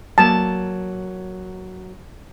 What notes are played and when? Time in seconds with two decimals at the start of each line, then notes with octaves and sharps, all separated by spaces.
0.18 F#3 A#3 A5